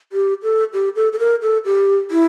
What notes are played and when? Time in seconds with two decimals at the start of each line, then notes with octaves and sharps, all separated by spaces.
0.12 G4
0.43 A4
0.73 G4
0.96 A4
1.13 A4
1.19 A#4
1.42 A4
1.65 G4
2.11 E4